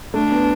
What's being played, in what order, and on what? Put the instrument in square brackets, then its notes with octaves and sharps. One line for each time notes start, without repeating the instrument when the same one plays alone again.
[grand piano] A3 [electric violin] D4
[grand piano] B3